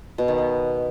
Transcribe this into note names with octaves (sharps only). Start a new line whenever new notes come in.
B2
D#3
B3